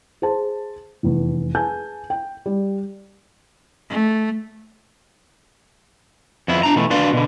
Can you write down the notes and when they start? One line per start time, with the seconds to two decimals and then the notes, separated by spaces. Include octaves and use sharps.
0.22 G#4 C5 A5
1.03 F1 E2
1.55 G#4 B4 G#5 A5 G6
2.10 G5
2.46 G3
3.90 A3
6.48 F2 B3 E4
6.63 D4 A#5
6.76 B2 E3 A3
6.91 D4 F#4 B4 D5 F5 C6
7.13 B2 D3